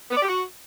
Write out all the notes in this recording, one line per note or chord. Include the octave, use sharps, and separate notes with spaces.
B3
D5
G4
F#4